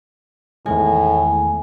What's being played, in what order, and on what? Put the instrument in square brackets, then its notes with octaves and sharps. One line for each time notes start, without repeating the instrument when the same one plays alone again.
[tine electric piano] E2 D#3 G#3 [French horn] A2 [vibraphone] G#5